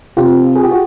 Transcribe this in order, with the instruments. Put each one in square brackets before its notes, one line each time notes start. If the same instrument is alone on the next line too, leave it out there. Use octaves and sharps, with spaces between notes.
[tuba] C3 [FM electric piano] F4 G4
[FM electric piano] G#4
G4
F#4